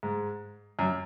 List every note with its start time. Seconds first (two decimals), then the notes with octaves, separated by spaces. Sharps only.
0.03 G#2
0.79 F#2